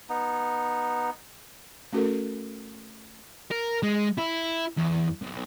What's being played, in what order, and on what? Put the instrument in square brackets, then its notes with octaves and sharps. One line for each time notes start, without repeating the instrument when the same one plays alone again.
[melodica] B3 D#4
[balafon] A3 C#4 F#4 A4 A#4
[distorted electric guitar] A#4
G#3
E4
E2
B1